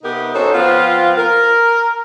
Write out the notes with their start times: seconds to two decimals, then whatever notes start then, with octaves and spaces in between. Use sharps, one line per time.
0.03 C3 B3 D#4 G4 A#4
0.34 C#4 D#4 F#4 A4 C5
0.53 F3 B3 C4 F4
1.16 A#4